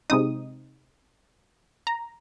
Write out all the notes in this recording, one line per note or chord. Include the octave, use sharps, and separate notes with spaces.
C3 G#3 C4 D#4 D#6
A#5